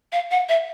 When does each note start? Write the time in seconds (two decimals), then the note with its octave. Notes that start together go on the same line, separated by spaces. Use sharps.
0.12 F5
0.31 F#5
0.49 E5